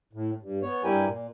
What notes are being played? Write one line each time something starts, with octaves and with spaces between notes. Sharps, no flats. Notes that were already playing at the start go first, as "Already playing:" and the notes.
A2
G2
B3 C#5
G2 G3 E4 G4 A#4 G#5
A#2